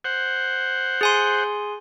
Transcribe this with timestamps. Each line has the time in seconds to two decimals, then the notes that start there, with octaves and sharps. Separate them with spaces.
0.05 C5 F#5
1.01 G#4 G#5 C6